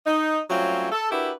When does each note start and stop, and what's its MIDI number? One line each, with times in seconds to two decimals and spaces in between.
0.06 0.41 63
0.50 0.88 54
0.50 0.88 55
0.50 0.88 57
0.50 0.88 60
0.50 0.88 61
0.50 0.88 65
0.92 1.09 69
1.11 1.31 62
1.11 1.31 64
1.11 1.31 66
1.11 1.31 67
1.11 1.31 70
1.11 1.31 71